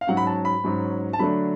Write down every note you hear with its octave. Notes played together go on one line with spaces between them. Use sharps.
F5
G#2 F#3 C#4 F#5
B5
A5
B5
G#2 F#3 C#4
A5
D3 F#3 A3 D4 B5